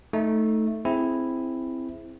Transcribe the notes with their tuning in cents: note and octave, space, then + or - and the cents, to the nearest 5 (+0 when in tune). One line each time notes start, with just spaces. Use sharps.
A3 +0 D#4 +10
C4 +0 E4 +0 G#4 +0